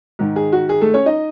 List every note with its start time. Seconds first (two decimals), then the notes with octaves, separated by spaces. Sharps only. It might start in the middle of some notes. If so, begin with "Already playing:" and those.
0.19 G#2 D#3
0.36 G#4
0.52 F#4
0.69 G#4
0.81 A3 A4
0.94 C#4 C#5
1.06 D#4 D#5